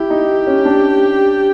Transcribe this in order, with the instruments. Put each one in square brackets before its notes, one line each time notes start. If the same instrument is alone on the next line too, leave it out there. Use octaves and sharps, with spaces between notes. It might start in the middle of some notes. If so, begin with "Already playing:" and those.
Already playing: [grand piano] E4 [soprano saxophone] G4
[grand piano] D#4
C#4
D4